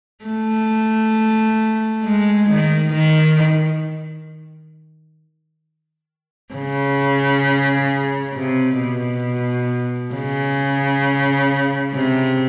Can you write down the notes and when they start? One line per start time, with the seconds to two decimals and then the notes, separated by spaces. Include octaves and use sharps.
0.25 A3
2.04 G#3
2.50 D#3
2.94 D#3
6.55 C#3
8.34 C3
8.79 B2
10.14 C#3
11.94 C3